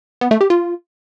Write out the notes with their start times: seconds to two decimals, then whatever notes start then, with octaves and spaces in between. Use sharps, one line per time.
0.21 B3
0.31 A3
0.41 G4
0.50 F4